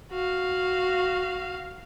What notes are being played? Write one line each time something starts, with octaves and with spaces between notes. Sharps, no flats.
F#4 F5